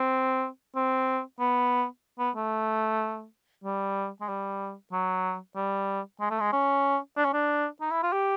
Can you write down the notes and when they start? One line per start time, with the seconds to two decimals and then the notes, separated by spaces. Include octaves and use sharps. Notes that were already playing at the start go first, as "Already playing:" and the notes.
Already playing: C4
0.76 C4
1.40 B3
2.19 B3
2.36 A3
3.64 G3
4.21 G#3
4.29 G3
4.92 F#3
5.56 G3
6.21 G#3
6.31 A3
6.40 G#3
6.53 C#4
7.17 D4
7.25 C#4
7.34 D4
7.81 D#4
7.91 E4
8.03 F4
8.13 G4